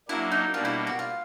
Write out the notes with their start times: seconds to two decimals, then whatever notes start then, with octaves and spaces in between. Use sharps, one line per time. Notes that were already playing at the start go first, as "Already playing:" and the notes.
0.08 F#3 A#3 D4 E4
0.32 D#4
0.54 B2 G3 A#3 D4 F4
0.65 E4
0.87 F#4
0.99 F4